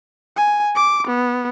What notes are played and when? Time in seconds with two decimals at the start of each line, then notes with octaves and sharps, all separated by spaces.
0.37 G#5
0.76 D6
1.07 B3